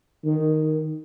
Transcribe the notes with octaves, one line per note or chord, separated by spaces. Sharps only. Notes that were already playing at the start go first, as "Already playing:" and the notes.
D#3